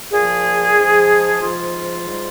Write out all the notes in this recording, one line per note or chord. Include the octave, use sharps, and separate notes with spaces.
A#2 F3 G#4
G#2 F3
G#2 F3 F4
G#2 G3